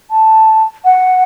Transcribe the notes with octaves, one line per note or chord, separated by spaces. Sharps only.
A5
F#5